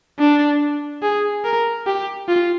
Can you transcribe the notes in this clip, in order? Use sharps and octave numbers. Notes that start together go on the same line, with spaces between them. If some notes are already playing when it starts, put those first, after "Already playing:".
D4
G#4
A#4
G4
F4